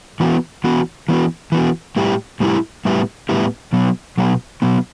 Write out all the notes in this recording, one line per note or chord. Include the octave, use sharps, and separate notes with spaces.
E3 B3 F#4
E3 B3 F#4
E3 B3 F#4
E3 B3 F#4
A2 G3 B3 E4 G4
A2 G3 B3 E4 G4
A2 G3 B3 E4 G4
A2 G3 B3 E4 G4
B2 F#3 B3
B2 F#3 B3
B2 F#3 B3